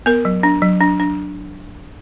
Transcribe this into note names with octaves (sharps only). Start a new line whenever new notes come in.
B3 A#4
F#3
D4
F#3
D4
D4